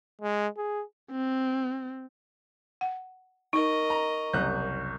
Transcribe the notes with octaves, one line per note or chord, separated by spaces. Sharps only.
G#3
G#4
C4
F#5
D#4 A#4 D#5 C#6
A#5
F#1 C2 F#6 G6